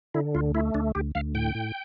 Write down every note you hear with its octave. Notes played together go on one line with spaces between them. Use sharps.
D3 E4
D2 F4
A3 E4
D2 D4
D2 G4
D2 F5
A2 G5
A2